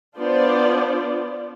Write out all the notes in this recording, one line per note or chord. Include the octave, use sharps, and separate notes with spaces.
B3 D4 F4 C5 D5